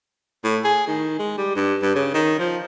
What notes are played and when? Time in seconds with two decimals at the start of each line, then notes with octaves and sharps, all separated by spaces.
0.44 A2
0.64 G#4
0.87 D#3
1.19 G#3
1.38 G3
1.56 G2
1.82 G2
1.95 C#3
2.14 D#3
2.39 F3